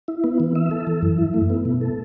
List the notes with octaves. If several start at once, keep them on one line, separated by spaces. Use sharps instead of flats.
E4
B3
E3
E5
A4
E3
F#2
E4
A3
B3
B2
A4